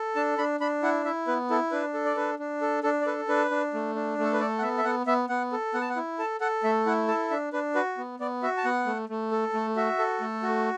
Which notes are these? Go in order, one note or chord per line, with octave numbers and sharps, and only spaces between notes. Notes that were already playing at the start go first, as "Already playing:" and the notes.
Already playing: A4
D4 A5
D4 B5
D4 B5
E4 F#5
E4 E5
B3 B4
E4 A4
D4 B4
A4
D5
D4 B4
D4
A4
D4 A4
D5
A4 B4
D4 B4
D4
A3
D4
A3
A4
B4
A4 D5
F#5
B3 E5
E5
B3 F#5
B3 E5
B3 F#5
A4
B3 F#5
A5
F#5
E4
A4 A5
A4 F#5
A3 E5
E4 F#5
A4 A5
D4 E5
D4 B4
F#4 B4
B3
B3 D5
F#4 E5
A5
B3 F#5
A3
A3
A4
A3
F#4 E5
A4
A3
F#4